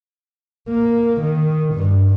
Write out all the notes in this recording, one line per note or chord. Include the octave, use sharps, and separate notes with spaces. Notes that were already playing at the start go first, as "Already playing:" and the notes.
A#3
D#3
G2